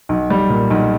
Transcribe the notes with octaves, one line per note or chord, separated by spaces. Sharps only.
B1
G3
A#2
B1